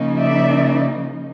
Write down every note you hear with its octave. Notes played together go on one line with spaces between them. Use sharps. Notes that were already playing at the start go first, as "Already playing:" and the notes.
Already playing: C#3 F3 A#3 D#4
D5 E5